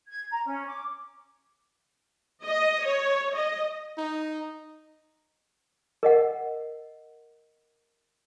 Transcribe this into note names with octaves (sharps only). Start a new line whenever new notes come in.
G#6
A#5
C#4
D6
D#5
C#5
D#5
D#4
A#4 D#5 F#5